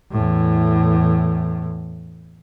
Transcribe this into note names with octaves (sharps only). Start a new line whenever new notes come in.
E2 A2